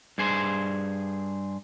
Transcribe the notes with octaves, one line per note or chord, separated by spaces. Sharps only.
G2 G#4 C5